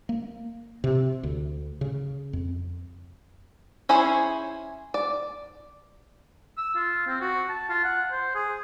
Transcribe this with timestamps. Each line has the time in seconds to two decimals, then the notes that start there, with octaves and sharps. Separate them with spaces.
0.09 A#3
0.84 C3
1.23 D2
1.81 C#3
2.33 F2
3.89 C#4 E4 G#4 C5 C#5
4.94 D5
6.57 E6
6.75 F4
7.07 C4
7.21 F#4
7.49 A5
7.69 F4
7.84 F#5
8.12 C5
8.35 G#4